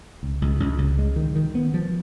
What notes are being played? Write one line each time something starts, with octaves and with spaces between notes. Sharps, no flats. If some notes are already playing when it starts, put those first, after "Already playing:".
C#2
C#2
C#2
C#2
G#3
D#3
D#3
B3
F3